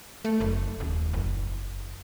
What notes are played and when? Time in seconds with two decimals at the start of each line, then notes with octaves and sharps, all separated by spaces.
0.25 A3
0.40 F#1
0.80 D#1
1.13 F#1